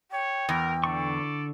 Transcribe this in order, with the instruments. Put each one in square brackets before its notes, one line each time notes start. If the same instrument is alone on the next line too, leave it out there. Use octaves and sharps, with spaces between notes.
[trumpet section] C#5 [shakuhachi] G5
[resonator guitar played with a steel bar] E2 [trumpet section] A#4
[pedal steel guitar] D3 C#6 [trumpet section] A4 D5